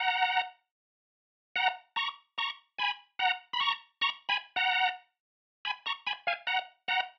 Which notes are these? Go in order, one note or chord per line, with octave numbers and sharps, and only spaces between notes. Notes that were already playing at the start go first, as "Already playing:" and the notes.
Already playing: F#5 A#5
F#5 A#5
A#5 C#6
A#5 C#6
G#5 B5
F#5 A#5
B5
A#5 C#6
A#5 C#6
G#5 B5
F#5 A#5
G#5 B5
A#5 C#6
G#5 B5
F5 G#5
F#5 A#5
F#5 A#5